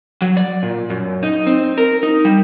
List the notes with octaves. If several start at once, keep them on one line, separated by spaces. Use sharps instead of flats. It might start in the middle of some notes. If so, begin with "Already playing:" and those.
F#3
D5
A#2
F#2
D#4
C4
A#4
D#4
G3